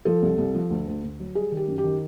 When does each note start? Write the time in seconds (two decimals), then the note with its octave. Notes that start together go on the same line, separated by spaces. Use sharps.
0.05 F3 A4
0.22 C2
0.38 C2
0.55 F3
0.70 D2
0.87 D2
1.04 D2
1.19 F#3
1.35 G3 G#4
1.52 D#3
1.57 G4
1.68 F#2
1.78 G4
1.84 D#3